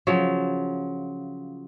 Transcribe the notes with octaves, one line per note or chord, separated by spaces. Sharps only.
C#3 F3 F#3